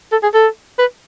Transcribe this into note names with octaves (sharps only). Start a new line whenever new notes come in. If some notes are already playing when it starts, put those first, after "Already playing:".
A4
G#4
A4
B4